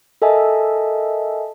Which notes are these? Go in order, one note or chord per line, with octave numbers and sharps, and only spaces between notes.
A4 A#4 D#5 E5 G#5 A5